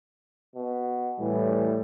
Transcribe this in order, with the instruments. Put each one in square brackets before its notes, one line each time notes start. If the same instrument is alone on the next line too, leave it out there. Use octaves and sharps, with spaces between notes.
[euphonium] B2
[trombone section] A2 G3 [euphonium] E3